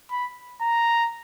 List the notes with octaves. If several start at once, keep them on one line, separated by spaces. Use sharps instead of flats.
B5
A#5